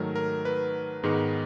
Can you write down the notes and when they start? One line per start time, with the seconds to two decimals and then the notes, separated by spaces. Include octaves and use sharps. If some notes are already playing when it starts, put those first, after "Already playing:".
Already playing: G#2 D#3 F#3 A3 A#4
0.16 A#4
0.45 B4
1.03 G#2 D#3 G#3 B3